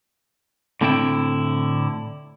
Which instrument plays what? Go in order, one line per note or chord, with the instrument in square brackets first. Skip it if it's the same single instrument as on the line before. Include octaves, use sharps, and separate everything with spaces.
[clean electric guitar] A2 D3 C4 E4 G5